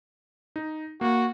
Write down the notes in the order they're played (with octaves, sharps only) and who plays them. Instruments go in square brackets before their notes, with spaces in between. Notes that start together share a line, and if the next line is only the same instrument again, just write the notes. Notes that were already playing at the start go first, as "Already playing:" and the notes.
[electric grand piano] D#4
[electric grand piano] A#3 [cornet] F#4